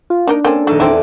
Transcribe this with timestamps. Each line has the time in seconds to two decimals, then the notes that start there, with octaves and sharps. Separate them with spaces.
0.10 F4
0.27 A#3 D4 D#4 A#4
0.45 A#3 C4 C#4 A4
0.67 D#1 A3 D#4 A4
0.80 E2 C4 E4 D5